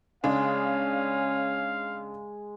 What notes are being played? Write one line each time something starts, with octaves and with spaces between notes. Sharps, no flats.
C#3 G#3 C#4 D4 F5